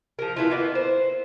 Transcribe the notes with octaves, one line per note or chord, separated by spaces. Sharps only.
F3 A#4
B3 E4 F4
A#3 B3 D#4 E4
C5